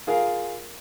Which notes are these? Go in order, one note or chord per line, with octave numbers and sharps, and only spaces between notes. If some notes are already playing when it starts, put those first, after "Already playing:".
F4 G#4 A#4 F5